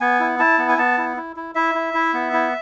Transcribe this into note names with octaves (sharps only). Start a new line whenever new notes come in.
B3 G#5
E4
E4 A5
B3
G#5
B3 A5
E4
E4
E4
E4 E5
E4
E4
B3
E4